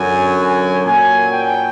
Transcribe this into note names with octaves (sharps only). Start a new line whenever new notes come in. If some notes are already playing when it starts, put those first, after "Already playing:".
Already playing: F#2 D3 F#3 G#5
G#5
A#2 F#3 G#5
G5